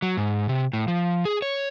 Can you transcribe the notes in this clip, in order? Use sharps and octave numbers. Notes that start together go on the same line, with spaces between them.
F#3
G#2
C3
A2
F3
G#4
C#5